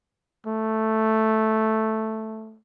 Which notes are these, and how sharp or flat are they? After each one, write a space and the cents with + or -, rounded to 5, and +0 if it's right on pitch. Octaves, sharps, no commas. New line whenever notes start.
A3 +0